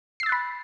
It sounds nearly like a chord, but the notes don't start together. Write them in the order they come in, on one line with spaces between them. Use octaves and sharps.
C7 E6 A6 F#6 B5